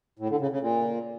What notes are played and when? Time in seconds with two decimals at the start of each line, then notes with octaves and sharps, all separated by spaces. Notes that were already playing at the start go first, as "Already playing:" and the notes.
0.19 A2
0.30 D3
0.40 C#3
0.51 C#3
0.61 A#2